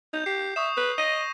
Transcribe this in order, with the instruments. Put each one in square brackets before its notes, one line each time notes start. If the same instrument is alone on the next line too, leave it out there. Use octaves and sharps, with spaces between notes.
[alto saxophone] D#4 [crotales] G6
[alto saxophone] G4 [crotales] C7
[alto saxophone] E5 [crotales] C#6 D#6 E7
[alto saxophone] B4
[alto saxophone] D#5 [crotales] A#6 D#7